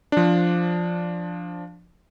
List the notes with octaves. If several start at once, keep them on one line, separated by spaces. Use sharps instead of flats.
F3 D4